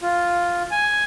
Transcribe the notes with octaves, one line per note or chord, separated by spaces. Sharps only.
F4
G#5